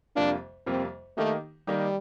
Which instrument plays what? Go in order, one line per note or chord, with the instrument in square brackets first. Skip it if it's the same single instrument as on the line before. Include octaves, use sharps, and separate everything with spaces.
[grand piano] F2 C3 G3 A#3 F4 [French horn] D4
[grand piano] F2 C3 G3 A#3 F4 [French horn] C4
[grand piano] D#3 A#3 D#4 G4 [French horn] A3
[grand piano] D#3 A#3 D#4 G4 [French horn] G3